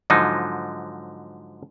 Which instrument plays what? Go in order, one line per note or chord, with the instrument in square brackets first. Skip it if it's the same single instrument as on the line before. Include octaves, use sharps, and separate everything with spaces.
[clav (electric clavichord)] G#2 D3 F3 F#3 D#4